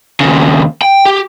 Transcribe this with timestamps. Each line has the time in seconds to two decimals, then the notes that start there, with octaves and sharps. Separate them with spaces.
0.20 D#2 C#3
0.82 G5
1.06 G4